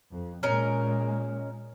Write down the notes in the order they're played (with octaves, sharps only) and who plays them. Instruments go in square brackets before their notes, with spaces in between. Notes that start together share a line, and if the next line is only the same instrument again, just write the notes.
[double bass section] F2
[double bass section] A#2 G#3 [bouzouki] C#4 D#4 A#4